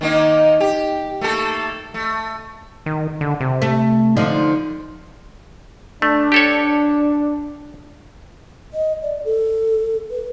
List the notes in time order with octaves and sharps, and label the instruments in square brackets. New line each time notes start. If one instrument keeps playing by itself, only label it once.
[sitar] D#3 A#3 D#4
G4
A3 A#3 A4
A3
[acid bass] D#3
D3
C3
[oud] A3
D3 F3 D#4
[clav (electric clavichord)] A3 [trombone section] D4
[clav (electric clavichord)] G4 A4 C#5
[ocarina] D#5
D5
A4
B4